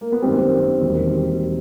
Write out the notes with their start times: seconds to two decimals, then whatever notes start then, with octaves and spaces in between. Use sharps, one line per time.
0.01 A#3
0.12 B3
0.22 G#1 F#2 D#3 G3 C4
0.37 C4
0.82 E1 D#2 D#3 G3